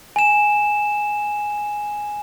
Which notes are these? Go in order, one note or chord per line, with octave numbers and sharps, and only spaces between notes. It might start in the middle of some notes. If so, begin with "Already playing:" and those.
G#5 E7